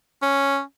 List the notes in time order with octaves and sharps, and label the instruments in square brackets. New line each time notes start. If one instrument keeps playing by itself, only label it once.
[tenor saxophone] C#4